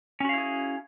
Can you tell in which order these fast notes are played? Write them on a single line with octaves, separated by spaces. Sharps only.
C#4 F#4 F5 E4 G#4